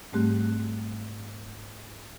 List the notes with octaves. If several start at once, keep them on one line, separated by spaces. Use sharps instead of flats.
G#2 G3 A3 C4 G4 F#6